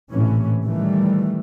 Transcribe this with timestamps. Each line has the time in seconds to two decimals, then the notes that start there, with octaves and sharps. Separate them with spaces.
0.11 A#1 A2 C3 E3 C#4
0.64 D#3 E3 G3 A3